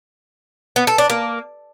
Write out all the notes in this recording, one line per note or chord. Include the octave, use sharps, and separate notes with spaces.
B3
A4
D4
A#3